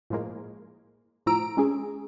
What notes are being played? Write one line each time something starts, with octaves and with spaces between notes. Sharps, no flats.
A2 F3 G#3 A#3
A2 F3 A#5 E6 D7
G#3 C#4 G#4